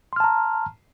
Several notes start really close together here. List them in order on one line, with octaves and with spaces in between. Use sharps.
C6 F6 A5 A#5